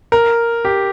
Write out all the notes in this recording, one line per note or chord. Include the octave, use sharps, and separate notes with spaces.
A#4
G4